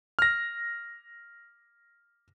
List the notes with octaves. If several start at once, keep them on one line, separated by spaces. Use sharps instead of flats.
F6 A#6